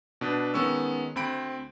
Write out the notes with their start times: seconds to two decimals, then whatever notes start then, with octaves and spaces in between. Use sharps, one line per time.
0.21 B2 D4 B4
0.54 D#3 G#3 B3 C#4 C#6 E6
1.16 D2 C4 B5 D7